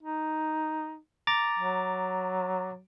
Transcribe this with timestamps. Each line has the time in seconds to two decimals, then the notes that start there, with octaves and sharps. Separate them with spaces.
0.03 D#4
1.27 A#5 D6 A6
1.59 F#3